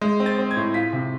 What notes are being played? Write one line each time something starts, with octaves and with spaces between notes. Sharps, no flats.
G#3
C4
A6
C4
G#6
A2
F4 B6
C3